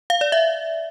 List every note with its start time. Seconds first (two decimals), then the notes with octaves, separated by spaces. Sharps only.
0.10 F5
0.21 D5
0.32 E5